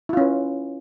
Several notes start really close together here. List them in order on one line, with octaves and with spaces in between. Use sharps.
E4 F4 C#4 B4